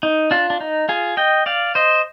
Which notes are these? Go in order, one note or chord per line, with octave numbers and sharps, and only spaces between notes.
D#4
D4 F4
D4
D#4
F4 G#4
D#5 G5
D5 F5
C5 D#5